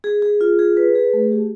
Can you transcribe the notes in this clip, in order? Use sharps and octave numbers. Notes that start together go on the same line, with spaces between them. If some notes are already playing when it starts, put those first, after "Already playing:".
G#4
G#4
F4
G#4
B4
G#4
A3
G4